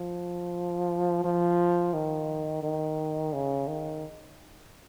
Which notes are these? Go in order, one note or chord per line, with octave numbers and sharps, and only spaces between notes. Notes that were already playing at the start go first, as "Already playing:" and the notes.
Already playing: F3
F3
D#3
D#3
C#3
D#3